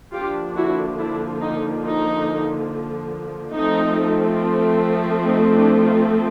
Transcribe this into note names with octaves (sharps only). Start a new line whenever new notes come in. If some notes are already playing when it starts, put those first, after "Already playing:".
D3 F3 A#3 D4 F4 G4
E4 F#4
D4 E4
D#4
D#4
F3 A3 C4 D#4
D#4
D4 E4
D#4 F4